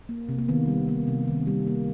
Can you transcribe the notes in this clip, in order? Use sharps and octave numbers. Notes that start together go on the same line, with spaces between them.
A#3
C3
A#3
D#3 B3
G3
A#3
C3
D#3
G3
A#3